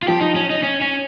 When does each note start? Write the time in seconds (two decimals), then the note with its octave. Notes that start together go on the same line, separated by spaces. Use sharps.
0.03 F4
0.07 F3 G4
0.21 D#4
0.36 C#4
0.50 D#4
0.63 C#4
0.82 C#4